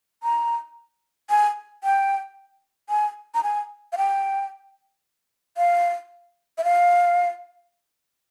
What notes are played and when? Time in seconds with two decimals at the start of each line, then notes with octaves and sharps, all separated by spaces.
0.23 A#5
1.30 G#5
1.84 G5
2.90 G#5
3.35 A#5
3.43 G#5
3.93 F5
3.98 G5
5.57 F5
6.58 E5
6.64 F5